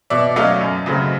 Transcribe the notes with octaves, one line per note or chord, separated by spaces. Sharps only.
B2 D5 E5
F#3 A3 C#4 D#5 F5
F#2
C#3 F#3 A3 C4